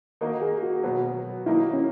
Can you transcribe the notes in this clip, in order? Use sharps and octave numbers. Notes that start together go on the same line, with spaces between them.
D#3 A#3 D#4 F#4 A#4
G#4
F#4
B2 F#3 B3
D#3 F#3 A#3 D#4 E4
C#4